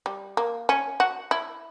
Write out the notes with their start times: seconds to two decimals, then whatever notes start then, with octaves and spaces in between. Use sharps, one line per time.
0.06 G3
0.37 A#3
0.69 C#4
1.00 F#4
1.31 E4